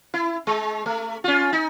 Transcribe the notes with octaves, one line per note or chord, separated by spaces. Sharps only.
E4
G#3
A3
C#4 F4
D#4